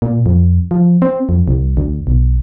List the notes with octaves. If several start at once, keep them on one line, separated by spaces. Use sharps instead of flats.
A#2
F2
F3
C4
F2
C2
D2
B1